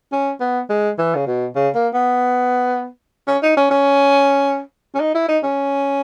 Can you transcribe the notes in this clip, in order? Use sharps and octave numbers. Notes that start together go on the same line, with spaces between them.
C#4
B3
G#3
E3
C#3
B2
C#3
A#3
B3
C#4
D#4
C#4
C#4
C#4
D#4
E4
D#4
C#4